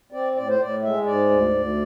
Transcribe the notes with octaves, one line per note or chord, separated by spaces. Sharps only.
C4 D5
A2 D5
C5
A2 D5
G#3 E5
G#2 D5
D2
D2